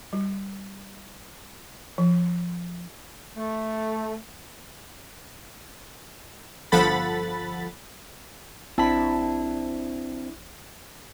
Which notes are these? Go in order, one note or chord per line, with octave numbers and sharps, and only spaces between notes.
G3
F3
A3
G1 F3 A4 F#5 B5 A6
A#1 C4 D4 E4 A5 B5